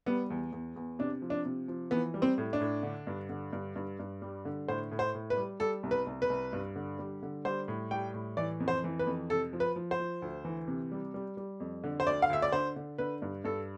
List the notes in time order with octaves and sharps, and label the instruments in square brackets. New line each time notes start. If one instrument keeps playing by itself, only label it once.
[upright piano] G3 B3
E2
E2
E2
C3 D4
F3
D4
C3
F3
E3 B3
G3
C4
A2
D4
A2
D3
G2
D3
G2
G2
G2
G3
D3
A2 C5
A2
C5
A2
B4
G3
G3 A4
C2
B4
C2
B4
C2
G2
D3
G3
D3
G3 C5
A2
G3 G5
A2
E3 D5
F2
C5
E3
B4
F2
C3 A4
F3
B4
F3
C5
F3
D2
E3
C3
G3
G3
G3
F2
D3
C5
D2 D5
F5
D2 E5
D5
D3 C5
D3
D3 B4
G2
G2 A4